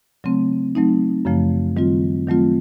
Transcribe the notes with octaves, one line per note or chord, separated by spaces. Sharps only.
C#3 F#3 A3 C4
F#3 A3 C4 D#4
F#2 C#3 F3 A3
D#3 G3 C4 F4
D#3 F#3 A3 C4 F4